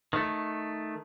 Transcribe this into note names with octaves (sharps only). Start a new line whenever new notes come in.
D#3 A3